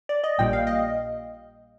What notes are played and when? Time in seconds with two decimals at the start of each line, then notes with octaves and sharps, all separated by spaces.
0.09 D5
0.24 D#5
0.38 A#1 A#2 G3 G5
0.53 F5
0.67 D#5